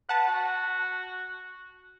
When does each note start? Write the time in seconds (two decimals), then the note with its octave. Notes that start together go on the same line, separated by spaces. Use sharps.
0.09 B4 F#5 A5
0.28 F#4